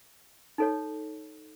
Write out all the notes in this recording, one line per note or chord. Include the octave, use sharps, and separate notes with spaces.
D#4 A4 C#5